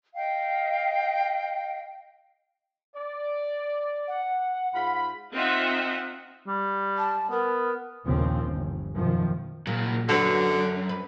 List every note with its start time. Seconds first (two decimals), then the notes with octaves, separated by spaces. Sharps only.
0.15 D#5 F5 G5
2.96 D5
4.08 F#5
4.75 G#2 F4 B5
5.34 C4 D#4 F4 D#5 E5 F#5
6.47 G3
6.98 A5
7.31 B3 A#4
8.07 A#1 D#2 C#3 F3 C4
8.48 G1
8.95 F#2 B2 D#3 F3
9.67 A#2 F#3 A#3
10.09 F#2 D3 F#4 B4
10.89 B4